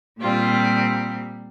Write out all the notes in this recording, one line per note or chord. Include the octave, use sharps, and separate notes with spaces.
A#2 G3 C4 F4